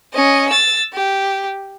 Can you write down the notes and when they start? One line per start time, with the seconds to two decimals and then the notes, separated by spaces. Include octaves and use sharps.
0.14 C#4 D#5
0.49 E6 A6
0.93 G4